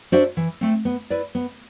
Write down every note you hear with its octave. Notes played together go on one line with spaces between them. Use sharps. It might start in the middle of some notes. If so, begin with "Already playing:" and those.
D4 F#4 C5 E5
E3
A3 C4
B3
E4 B4 D5
B3